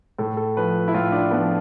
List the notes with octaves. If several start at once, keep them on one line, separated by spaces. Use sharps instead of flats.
A2 A4
A4
F3 B4
E4
A2 F4
D4
F3 B3